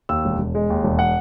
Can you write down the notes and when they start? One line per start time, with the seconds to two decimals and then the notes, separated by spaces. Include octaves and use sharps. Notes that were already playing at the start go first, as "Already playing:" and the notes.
0.09 D#2 E6
0.25 E1
0.39 E1
0.55 G#3
0.70 D#2
0.84 E1
0.99 F#5